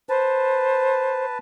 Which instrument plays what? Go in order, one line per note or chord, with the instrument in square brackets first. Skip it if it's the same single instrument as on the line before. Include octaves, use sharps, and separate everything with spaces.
[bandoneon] B4 A5 [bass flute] C5